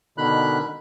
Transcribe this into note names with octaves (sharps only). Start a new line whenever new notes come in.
B2 D3 D#3 B5 F#6